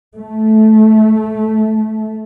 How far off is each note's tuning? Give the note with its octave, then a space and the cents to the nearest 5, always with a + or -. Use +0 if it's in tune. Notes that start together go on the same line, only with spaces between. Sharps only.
A3 -15